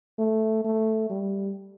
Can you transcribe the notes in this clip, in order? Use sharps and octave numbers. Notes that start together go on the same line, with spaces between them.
A3
A3
G3